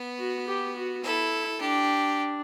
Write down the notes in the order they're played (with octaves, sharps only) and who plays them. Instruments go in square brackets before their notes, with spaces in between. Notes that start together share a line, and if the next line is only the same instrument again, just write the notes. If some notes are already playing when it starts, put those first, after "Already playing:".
Already playing: [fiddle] B3
[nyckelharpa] F#4
G4
F#4
[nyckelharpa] E4 [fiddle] A4
[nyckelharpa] D4 [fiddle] G4